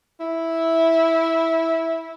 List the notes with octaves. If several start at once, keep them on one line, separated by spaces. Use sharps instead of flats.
E4